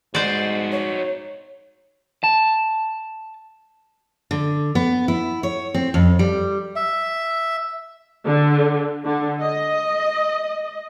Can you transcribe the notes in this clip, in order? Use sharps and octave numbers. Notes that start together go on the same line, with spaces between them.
G#2 D#4 F#4 C5 D5
C#5
A5
D3
B3
E4
C#5
C4
F2
G3
E5
D3
D3
D#5